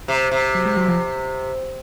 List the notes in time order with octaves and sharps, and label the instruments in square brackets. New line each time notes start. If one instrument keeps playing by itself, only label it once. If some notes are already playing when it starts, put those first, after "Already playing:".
[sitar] C3
C3
[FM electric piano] F#3
G#3
F#3
F3